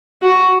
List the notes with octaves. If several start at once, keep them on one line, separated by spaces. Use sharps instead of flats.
F#4